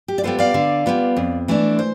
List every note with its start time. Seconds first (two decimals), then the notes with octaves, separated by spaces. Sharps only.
0.08 G4
0.18 D5
0.23 G3 B3 F4 A4 C5
0.39 D5 F5
0.54 D3
0.86 G3 B3 F4
1.17 F2
1.48 E3 A3 D4
1.79 C5